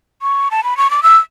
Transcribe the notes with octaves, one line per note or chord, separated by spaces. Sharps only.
C#6
A5
B5
C#6
D6
E6